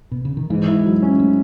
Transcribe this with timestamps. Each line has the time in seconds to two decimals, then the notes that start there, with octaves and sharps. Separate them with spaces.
0.12 B2
0.25 C#3
0.37 D#3
0.50 G#2 E3
0.68 E4
0.86 F#3
1.02 C#4
1.20 A3